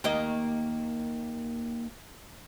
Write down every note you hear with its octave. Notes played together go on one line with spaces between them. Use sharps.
D#2 A#3 D#5